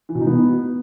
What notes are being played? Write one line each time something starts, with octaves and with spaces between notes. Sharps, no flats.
E3
B2
D#4
B3